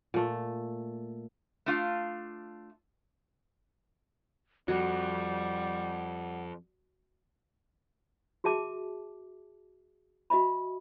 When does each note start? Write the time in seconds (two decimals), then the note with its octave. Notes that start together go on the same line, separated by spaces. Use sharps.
0.14 A#2 A3
1.66 A3 D4 F4 F5
4.68 F2 G3 F#4 F#5
8.44 F#4 G#4 E5 A5 D6
10.30 F#4 D#5 E5 B5